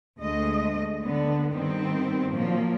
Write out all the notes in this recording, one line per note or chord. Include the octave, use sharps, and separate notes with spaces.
D2 G#3 A3 D#5
D3 B3
G2 D#3 B3 C4
A#2 F3 F#3 A#3